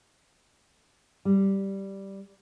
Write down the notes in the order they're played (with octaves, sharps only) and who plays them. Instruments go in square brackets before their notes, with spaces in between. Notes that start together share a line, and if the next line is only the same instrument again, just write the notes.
[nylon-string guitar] G3